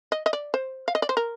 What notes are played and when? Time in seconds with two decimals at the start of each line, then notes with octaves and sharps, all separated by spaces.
0.12 D#5
0.26 D#5
0.33 D5
0.54 C5
0.88 F5
0.95 D#5
1.02 D5
1.09 C5
1.17 A#4